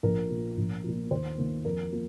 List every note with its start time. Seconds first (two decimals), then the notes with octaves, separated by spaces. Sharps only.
0.03 A#1 A#4
0.30 A#2 F3
0.57 A#1
0.84 A#2 F3
1.11 D#2 C5
1.38 D#3 A#3
1.65 F2 A#4
1.92 F3 A#3